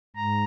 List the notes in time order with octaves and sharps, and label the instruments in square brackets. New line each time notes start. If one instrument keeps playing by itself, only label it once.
[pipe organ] G#2 A#5